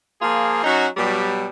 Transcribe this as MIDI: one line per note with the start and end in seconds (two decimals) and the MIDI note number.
0.21 0.63 53
0.21 0.63 58
0.21 0.63 65
0.21 0.63 68
0.64 0.87 54
0.64 0.87 61
0.64 0.87 63
0.64 0.87 66
0.97 1.47 47
0.97 1.47 54
0.97 1.47 55